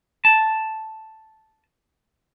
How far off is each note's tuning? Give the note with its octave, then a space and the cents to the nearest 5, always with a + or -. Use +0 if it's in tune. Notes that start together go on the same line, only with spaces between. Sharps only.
A5 +0